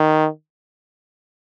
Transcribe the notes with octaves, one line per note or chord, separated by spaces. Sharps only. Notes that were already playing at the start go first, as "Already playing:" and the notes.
Already playing: D#3